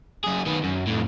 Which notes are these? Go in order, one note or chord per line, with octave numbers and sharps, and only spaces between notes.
F#2 G#4
D#3 B3
F#2
F2 A2